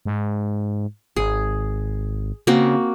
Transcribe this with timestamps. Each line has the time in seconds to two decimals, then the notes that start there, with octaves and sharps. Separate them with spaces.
0.05 G#2
1.16 G#1 G#4
2.47 C#3 A#3 C4 F#4